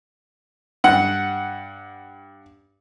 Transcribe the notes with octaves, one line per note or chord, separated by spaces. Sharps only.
G2 F#5